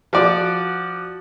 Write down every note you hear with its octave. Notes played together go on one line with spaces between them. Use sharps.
F3 F#4 D5